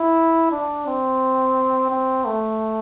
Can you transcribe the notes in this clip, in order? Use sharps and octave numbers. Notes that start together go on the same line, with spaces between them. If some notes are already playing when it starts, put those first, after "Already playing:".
Already playing: E4
D4
C4
C4
A3